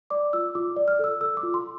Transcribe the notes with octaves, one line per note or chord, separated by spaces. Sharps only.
D5 D6
F4 E6
F4 D6
D5
F6
A4 E6
A4 E6
D6
F4
C6